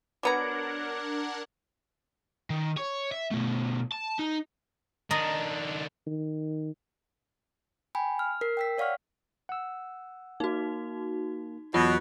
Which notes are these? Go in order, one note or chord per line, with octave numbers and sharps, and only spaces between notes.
F#3 B3 D4 A#4 F#5 A#5 D6 G#6
D#3
C#5
E5
B2 A3
A5
D#4
D#3 D4 D#5 A#5
D#3
G5 G#5 B5
F6
A#4 C7
G5 E6 B6
C#5 D5 F5 F#5 C#6 F6
F#5 E6
A#3 D#4 F#4
E2 B2 E3 F#3 F4